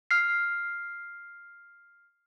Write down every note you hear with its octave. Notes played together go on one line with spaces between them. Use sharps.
F6 C7